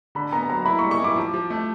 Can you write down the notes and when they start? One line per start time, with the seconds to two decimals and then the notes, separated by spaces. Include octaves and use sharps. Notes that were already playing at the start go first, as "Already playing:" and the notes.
0.15 D3 B5
0.32 B3 A#5
0.50 F#3 A#5
0.66 E4 B5
0.79 C#6
0.82 G3
0.91 C#6
0.99 E4
1.04 D6
1.16 F3
1.34 F3
1.50 A3